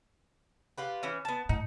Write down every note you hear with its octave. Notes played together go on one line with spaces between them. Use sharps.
F4 G4 B4
E3 C#4
B3 A5
A2 D#4